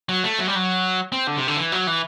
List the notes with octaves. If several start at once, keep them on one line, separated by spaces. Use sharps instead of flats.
F#3
A3
F#3
G3
F#3
C4
D3
C3
D3
E3
F#3
E3